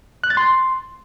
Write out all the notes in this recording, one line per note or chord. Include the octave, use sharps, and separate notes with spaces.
F#6
A6
C6